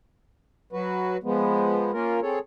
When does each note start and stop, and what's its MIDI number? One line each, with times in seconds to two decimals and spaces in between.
0.73 1.17 54
0.73 1.17 66
0.73 1.17 71
1.23 1.92 53
1.23 1.92 56
1.23 1.92 59
1.93 2.20 58
1.93 2.20 61
1.93 2.20 65
1.93 2.20 70
2.22 2.39 60
2.22 2.39 68
2.22 2.39 69
2.22 2.39 73